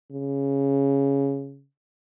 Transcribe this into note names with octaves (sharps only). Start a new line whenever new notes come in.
C#3